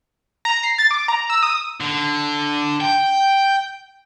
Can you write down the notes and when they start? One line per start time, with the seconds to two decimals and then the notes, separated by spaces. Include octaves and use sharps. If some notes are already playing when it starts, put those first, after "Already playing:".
0.45 A#5
0.63 C7
0.78 A6
0.91 D6
1.08 A#5
1.30 E6
1.43 D#6
1.80 D3
2.81 G5